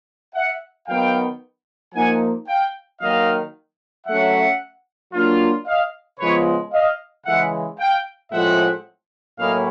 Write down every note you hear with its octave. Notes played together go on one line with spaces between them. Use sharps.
E5 F#5
D#3 F#3 B3 F5 G5
F3 A#3 D#4 F#5 G#5
F5 G5
D#3 F#3 A#3 D#4 D#5 F5
F#3 A3 C#4 E5 F#5
F#3 A#3 D4 F4
D#5 F5
C#3 F3 G#3 B3 B4 C#5
D#5 F5
C#3 E3 G#3 E5 F#5
F5 G5
A2 F3 G#3 C4 E5 F#5
A2 F#3 A#3 C#4 E4 D#5 F5